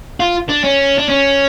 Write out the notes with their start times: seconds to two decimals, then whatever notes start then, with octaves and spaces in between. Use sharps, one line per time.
0.20 F4
0.49 D4
0.64 C#4
0.98 D4
1.09 C#4